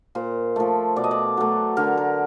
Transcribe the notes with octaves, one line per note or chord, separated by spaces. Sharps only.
A#2 C5
F3 A3
B2 D5
D#5
D5
F#3 A3
D3 A#4
A#4